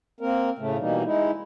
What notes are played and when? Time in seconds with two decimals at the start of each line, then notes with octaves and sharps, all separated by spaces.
0.20 A#3 C4 A#4
0.59 A2 C#3 A3
0.78 B2 E3 G3 A#3 D#4
1.04 G#3 D#4 E4